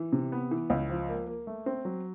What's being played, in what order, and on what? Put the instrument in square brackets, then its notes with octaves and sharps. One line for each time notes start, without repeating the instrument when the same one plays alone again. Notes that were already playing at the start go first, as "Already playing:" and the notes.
Already playing: [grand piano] E3
C3
B3
E3
C#2
F3
A#3
A#3
A3
C4
F#3